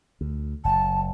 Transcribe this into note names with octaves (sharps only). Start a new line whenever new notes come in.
D2
F#1 A5